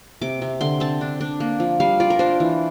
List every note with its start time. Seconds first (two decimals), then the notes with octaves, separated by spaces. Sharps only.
0.22 C3 D6
0.42 C3
0.61 D3 C6
0.80 C4 A5
1.01 D4
1.21 D4
1.40 A#3
1.60 F3
1.80 G3 F5
2.00 F4 D5
2.10 A#4
2.19 D4 C5
2.40 E3